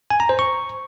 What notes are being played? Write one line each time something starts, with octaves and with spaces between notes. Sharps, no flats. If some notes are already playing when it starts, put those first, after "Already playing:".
G#5
A#5
C5
C#6